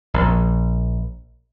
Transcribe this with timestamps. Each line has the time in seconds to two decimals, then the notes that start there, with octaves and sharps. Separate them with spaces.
0.14 A#1